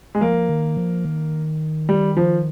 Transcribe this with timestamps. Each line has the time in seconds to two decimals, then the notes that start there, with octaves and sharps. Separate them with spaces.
0.15 G#3
0.21 F3 A#3
0.49 D#3
0.77 F3
1.05 D#3
1.89 G3
2.17 F3